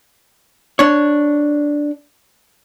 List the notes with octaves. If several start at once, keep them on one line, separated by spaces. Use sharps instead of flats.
D4 C#5